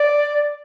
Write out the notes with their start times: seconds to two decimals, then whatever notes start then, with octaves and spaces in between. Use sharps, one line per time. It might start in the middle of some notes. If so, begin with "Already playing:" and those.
Already playing: D5